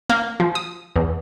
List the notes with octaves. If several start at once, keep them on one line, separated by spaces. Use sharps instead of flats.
A#3
F3
D#6
E2